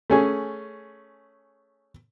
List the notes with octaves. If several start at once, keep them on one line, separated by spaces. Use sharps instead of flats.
A3 C#4 G#4